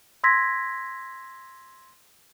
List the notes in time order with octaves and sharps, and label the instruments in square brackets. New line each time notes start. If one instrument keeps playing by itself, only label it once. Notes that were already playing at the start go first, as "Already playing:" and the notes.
[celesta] C6 E6 G#6 A#6 B6